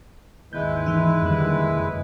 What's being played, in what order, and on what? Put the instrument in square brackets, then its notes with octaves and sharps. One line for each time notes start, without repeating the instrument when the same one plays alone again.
[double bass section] G#1 D#2 D#3 [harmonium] G#3 E4 B4 [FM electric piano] G6
[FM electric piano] E3 D#4
[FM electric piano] F2 D#3 [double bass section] D3 G3 A#3
[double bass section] F#1 C2 C#3